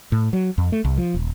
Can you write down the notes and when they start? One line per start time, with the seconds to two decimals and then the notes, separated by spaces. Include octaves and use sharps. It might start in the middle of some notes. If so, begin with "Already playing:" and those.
0.12 A2
0.33 F#3
0.58 F2
0.72 A3
0.85 C2
0.97 F3
1.14 D#1